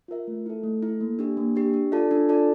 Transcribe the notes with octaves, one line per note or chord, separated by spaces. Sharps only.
F4 A#4 E5
A3
E4 A4
A3
E4 A4
A#3
D4 G4
A#3
D4 G4
D4
F4 A4 D5 A5
D4
F4 A4 D5 A5